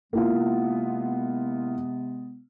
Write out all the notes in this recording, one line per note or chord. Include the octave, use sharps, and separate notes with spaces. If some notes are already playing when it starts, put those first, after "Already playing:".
C3 G#3 A#3 B3 E4 F4